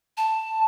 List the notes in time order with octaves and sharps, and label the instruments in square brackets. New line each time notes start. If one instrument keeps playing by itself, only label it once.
[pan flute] A5